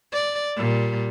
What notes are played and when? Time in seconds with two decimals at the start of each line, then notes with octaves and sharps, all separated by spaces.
0.12 D5
0.57 A#2 G3